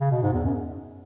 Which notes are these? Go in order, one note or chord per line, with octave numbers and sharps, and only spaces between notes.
C#3
B2
G#2
E2
F#2